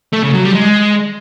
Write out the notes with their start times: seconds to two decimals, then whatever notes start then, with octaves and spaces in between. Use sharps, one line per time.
0.13 A3
0.23 C#3
0.34 F#3
0.44 G3
0.55 G#3